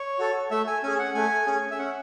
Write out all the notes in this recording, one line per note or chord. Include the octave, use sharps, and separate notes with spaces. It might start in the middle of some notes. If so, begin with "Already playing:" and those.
Already playing: C#5
F#4 A4
A3 E5
G#5
C#4 G#4 G#5
F#5
A3 G#5
C#4 G#4
E5
C#4 F#5